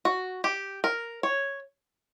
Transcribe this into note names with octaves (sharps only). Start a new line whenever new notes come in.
F#4
G4
A#4
C#5